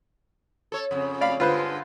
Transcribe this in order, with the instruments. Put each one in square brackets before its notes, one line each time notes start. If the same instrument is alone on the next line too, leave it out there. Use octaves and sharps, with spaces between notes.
[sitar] A4 C#5
F2 C#3
[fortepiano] D5 F5 B5
[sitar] G2 D3 G#3 [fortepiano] F4 B4 C5